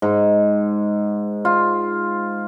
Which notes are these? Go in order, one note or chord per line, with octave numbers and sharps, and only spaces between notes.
G#2
F4